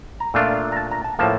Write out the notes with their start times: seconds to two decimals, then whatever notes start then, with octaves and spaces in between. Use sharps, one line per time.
0.20 A#5
0.34 A#2 A3 D4 F4
0.72 A#5
0.76 A5
0.91 A#5
1.04 A5
1.19 A2 F3 A#3 A5